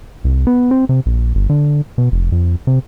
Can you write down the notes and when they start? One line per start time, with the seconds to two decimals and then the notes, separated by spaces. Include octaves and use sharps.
0.24 C2
0.47 B3
0.71 C4
0.89 C3
1.06 A#1
1.35 G1
1.49 D3
1.98 B2
2.12 F1
2.32 F2
2.67 C3